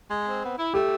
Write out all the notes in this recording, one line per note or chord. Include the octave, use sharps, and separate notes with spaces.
G#3
C4
B3
E4
A3 G4